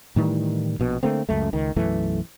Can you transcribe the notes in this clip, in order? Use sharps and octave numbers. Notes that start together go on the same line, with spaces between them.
A2 D#3 E3 G3
A#1 B2
D3 A3 A#3 C4
C#2 F#2 A3
C#2 D#3
B1 F#2 E3 A3